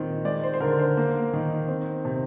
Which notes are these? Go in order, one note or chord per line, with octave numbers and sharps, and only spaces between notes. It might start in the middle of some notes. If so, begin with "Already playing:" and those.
Already playing: A#2 D#3 C4
G#3 D5
C5
C5
D3 A#4
C5
A#3
D#3
C4
C3